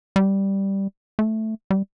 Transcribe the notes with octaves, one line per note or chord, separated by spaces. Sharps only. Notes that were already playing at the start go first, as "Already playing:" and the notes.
G3
A3
G3